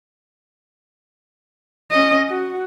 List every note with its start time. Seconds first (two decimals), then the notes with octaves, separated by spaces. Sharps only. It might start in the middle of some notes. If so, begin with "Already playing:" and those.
1.91 C#4 D#5
2.29 F#4